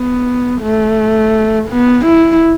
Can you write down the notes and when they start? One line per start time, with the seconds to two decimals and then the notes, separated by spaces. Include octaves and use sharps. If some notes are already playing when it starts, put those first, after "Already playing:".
Already playing: B3
0.61 A3
1.69 B3
2.06 E4